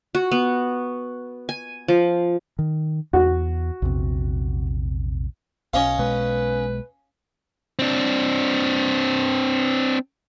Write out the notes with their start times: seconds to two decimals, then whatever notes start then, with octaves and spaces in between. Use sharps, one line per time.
0.15 F#4
0.32 B3
1.49 G#5
1.88 F3
2.59 D#3
3.13 E2 F#4
3.82 A#1 E2 C3
5.73 B1 C#4 D#5 F5
5.99 B1 B2 G#3 B4
7.79 C4 D4